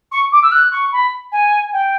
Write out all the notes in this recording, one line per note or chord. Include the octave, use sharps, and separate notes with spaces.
C#6
D6
E6
F#6
C#6
B5
G#5
G5